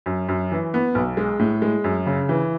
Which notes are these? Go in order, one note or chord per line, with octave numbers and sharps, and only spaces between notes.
F#2
F#2
E3
B3
B1
G#3
A2
G#3
F#2
C#3
E3